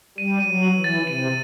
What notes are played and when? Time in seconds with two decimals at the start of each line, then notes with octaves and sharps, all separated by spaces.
0.18 G3 D#7
0.40 D#7
0.47 F#3
0.63 F#7
0.78 E3
0.84 A6
1.07 C3 D#7